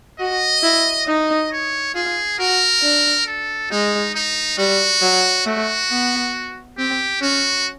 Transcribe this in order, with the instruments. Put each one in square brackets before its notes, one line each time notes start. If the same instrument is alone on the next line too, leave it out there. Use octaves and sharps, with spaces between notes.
[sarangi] F#4 [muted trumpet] D#5
[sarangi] E4
[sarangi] D#4 [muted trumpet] D#5
[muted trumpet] C#5
[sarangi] F4 [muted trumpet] G#4
[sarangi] F#4 [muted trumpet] A#4
[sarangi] D4
[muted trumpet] A4
[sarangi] G#3 [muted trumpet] D#4
[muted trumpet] D#4
[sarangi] G3 [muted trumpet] F#4
[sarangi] F#3
[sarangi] A3 [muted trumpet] F#4
[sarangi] B3
[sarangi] C4 [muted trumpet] G4
[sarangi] C#4 [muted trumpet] F#4